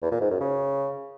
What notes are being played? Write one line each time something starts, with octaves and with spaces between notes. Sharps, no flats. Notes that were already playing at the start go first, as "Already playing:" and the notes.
E2
A#2
G#2
F#2
C#3